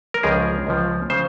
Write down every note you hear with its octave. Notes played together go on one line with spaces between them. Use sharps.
A#4
C#2 C#3 F3 G#4
C#2 C#3 F3
C#3 F3 C5